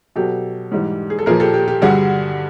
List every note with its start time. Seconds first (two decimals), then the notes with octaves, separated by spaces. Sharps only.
0.16 B2 F#3 G4 A4
0.72 G#2 E3 G3
1.10 G#4
1.19 A4
1.26 A#2 F3 G#4 A#4
1.40 G4 A4
1.54 G4
1.68 G4
1.82 G2 D3 G3 F#4 G#4